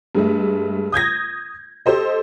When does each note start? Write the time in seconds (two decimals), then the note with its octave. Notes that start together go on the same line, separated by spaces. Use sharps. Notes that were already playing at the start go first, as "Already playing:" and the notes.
0.15 G2 G#3 A3
0.92 D#6 G6 G#6 A#6
1.86 G4 A4 C5 D#5